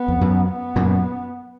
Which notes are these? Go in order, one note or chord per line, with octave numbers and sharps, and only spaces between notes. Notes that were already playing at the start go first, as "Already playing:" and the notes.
Already playing: B3
F2
F#2
B3
F#2 A#2